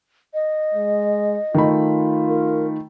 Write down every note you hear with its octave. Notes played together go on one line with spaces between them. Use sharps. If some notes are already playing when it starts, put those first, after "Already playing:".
D#5
G#3
D#3 A3 F4 B5
A#4